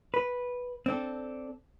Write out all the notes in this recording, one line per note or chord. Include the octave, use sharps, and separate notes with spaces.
B4
C4 D4 A4